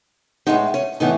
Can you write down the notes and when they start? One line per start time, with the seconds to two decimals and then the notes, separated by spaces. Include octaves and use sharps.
0.47 A2 G#3 B3 D#4
0.74 C#4
1.00 A2 E3 A3 B3 D#4